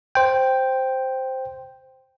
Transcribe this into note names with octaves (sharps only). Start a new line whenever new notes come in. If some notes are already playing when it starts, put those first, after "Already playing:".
C5 G5